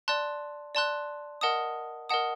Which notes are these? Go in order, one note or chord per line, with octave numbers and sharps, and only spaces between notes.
D5 A5 C6 F#6
D5 A5 C6 F#6
A#4 D#5 F#5 A5 D#6
A#4 D#5 F#5 A5 D#6